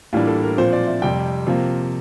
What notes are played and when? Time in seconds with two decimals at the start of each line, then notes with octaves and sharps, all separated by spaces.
0.13 A2 E3 G3 A#3 D4 F4
0.27 A4
0.43 A#4
0.58 A#2 F3 C4 C5
0.73 D5
0.87 E5
1.02 F2 C3 G3 G5
1.47 C3 F3 A#3